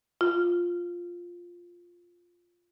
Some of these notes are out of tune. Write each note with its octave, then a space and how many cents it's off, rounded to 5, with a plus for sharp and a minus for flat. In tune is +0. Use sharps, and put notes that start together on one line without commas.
F4 +0